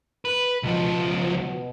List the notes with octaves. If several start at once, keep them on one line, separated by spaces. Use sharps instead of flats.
B4
C#2 B2 F3